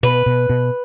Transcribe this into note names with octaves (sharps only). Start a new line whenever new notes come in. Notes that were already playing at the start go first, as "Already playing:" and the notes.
B2 B4
B2
B2